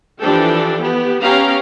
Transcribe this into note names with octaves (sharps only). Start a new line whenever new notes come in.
E3 F3 D4 G4 A4 G5
B3 G4
B3 C#4 G4 F5 G5 A#5